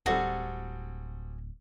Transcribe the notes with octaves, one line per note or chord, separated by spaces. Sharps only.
D1 G3 C4 F#4 G#4 A4